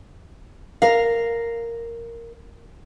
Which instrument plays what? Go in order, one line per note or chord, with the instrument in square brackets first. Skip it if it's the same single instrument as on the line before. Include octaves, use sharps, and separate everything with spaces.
[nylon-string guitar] A#4 F5